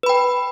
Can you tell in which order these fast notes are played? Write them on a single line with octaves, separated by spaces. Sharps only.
B4 B5 G5